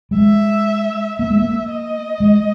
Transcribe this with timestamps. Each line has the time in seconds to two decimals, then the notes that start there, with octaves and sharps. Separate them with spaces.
0.11 G3
0.17 G#3 E5
1.19 A#3 E5
1.30 G#3
1.42 A#3
1.70 D#5
2.20 G#3